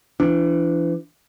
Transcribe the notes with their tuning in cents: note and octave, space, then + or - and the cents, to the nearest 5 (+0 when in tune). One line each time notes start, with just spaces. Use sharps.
E3 +40 D4 +0